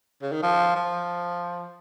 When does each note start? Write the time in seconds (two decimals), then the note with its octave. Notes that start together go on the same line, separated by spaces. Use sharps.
0.22 C#3
0.32 D#3
0.43 F3
0.76 F3